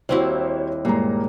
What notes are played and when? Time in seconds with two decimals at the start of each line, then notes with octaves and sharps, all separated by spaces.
0.09 D#2 G3 C4 E4 F#4 C5 C#5
0.85 G2 A#2 G#3 A#5